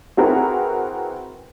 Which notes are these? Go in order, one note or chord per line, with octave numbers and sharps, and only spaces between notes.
C4 E4 F#4 G#4 A#4 B4